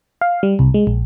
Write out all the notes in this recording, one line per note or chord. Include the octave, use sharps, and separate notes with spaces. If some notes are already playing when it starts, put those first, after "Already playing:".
F5
G3
C2
G#3
A#1